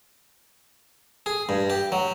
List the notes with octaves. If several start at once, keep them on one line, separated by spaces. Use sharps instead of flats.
G#4
G2
G4
F#3